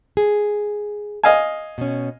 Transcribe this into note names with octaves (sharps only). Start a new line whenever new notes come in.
G#4
D#5 F5 G#5
B2 C#4